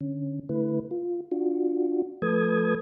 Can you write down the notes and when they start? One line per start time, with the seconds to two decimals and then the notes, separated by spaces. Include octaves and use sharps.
0.01 D3 C#4
0.49 D3 A3 E4 B4
0.91 F4
1.32 D4 F4 F#4
2.22 F3 A3 A4 B4 D#6 G#6